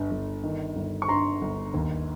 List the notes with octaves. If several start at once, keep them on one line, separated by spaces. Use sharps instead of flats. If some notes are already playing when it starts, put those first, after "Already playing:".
Already playing: G1 G2
G1
D#3
G1
C#6
G2 A#5 C6
G1
D#2